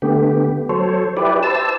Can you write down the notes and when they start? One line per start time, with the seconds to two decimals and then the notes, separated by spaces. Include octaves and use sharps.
0.02 D3 A3 B3 G4
0.69 F#3 A4 C5 C#5
1.17 E4 G4 B4 D5
1.43 C5 A5 E6